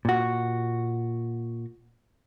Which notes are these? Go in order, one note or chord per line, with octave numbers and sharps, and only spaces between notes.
A#2 F#4